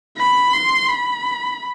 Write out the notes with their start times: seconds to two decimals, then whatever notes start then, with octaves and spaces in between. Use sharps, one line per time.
0.17 B5
0.53 C6
0.89 B5